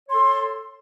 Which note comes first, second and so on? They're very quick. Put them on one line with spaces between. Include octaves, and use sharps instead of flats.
C#5 C6 A4